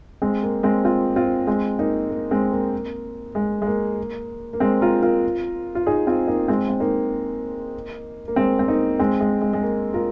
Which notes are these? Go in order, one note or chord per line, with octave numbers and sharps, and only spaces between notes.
G#3 C4
A#3
G#3 C4
C4 F4
C4 F4
G#3 C4
A#3 D#4
A#3
G#3 C4
A#3
G#3
G#3
A#3
A#3
G#3 C4
F4 A#4
F4 A#4
F4
D#4 G#4
C4 F4
A#3 D#4
G#3 C4
C4
A#3 D#4
A#3
G#3 C4
C4
A#3 D#4
G#3 C4
G#3
G#3
G#3
A#3
F4 A#4